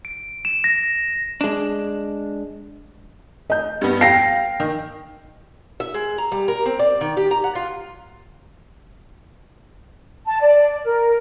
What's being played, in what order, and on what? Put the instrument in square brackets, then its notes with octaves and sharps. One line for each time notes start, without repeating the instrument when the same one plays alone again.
[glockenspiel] D7
E7
A#6
[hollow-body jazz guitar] G#3 D4
[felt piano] D#5 G6
[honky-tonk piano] G2 B3
[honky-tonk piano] F5 D7 [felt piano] G5 A#6 C7
[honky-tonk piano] D#3
[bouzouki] E5
G#3
A#5
G3
A#4
C4
D5
D#3
G4
A#5
F#5
F4
[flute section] A5
D5
A#4